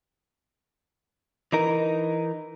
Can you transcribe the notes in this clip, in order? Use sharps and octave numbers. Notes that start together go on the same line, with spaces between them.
E3 D#4 A#4